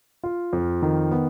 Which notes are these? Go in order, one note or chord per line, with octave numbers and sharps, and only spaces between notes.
F4
F2
D#3
B3